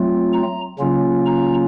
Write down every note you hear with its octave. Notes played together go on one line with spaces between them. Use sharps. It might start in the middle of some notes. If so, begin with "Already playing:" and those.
Already playing: F#3 A3 C4 F4
A#5
C#3 F#3 A#3 C#4 F4
A#5